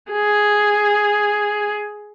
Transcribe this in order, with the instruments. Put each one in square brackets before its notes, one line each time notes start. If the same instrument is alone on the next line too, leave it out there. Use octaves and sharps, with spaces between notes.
[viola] G#4